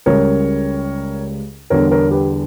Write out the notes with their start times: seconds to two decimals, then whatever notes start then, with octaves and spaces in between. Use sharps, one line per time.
0.06 C#2 C#3 G3 A#4 C#5
1.70 E2 D3 G3 A#4 C#5
1.91 A#4 C#5
2.11 G4 B4